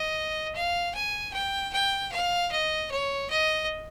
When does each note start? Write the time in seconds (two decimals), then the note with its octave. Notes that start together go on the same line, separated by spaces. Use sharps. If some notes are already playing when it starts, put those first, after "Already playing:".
Already playing: D#5
0.55 F5
0.94 G#5
1.33 G5
1.73 G5
2.12 F5
2.51 D#5
2.91 C#5
3.30 D#5